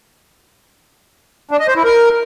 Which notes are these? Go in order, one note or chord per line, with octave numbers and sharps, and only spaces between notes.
D4
D#5
C5
E4
A#4